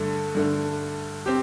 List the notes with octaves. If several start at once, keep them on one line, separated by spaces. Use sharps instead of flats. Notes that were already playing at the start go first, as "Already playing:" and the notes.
Already playing: G2 D3 A3
G2 D3 A3
C4 G4